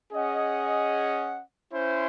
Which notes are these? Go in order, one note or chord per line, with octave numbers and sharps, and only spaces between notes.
C#4 G#4 D#5 F#5
C#4 E4 C5